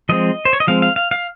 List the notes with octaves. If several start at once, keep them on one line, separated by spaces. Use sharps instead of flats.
F3 G#3 C4 D#5
C5
C#5
D#5
F3 G#3 C4 F5
F5
F5
F5